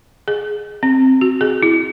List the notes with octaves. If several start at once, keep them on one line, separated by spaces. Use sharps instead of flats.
G#4
C4
F#4
G#4
E4